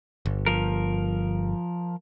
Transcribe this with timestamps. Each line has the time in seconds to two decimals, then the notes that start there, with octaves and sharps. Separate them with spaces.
0.26 G1
0.46 F3 A#4